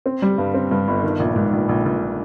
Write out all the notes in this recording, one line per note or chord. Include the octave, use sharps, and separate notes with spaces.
C4
G3
G2
C4
G2
G1
D#3
A#1
G#2
A#1
A#1
A#1